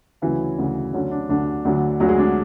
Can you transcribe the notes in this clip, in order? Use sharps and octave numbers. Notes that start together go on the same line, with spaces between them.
D2 C#3 E3 F#3 E4
D2 C#3 F#3
D2 D3 F#3 C#4
D4
D2 D3 F#3 D4
D2 D3 F#3
D2 D3 F#3 F#4
G#3 G#4
D4